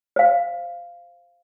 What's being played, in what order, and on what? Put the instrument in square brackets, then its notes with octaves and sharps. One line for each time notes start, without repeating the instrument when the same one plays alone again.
[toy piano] C5 F5